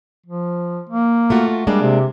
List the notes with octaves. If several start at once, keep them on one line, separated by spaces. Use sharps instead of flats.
F3
A#3
A3 F4 F#4
G3 G#3 A#3 D4
C3